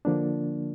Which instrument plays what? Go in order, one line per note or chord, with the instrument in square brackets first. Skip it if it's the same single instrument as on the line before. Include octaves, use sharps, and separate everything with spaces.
[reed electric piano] D3 F3 A#3 D4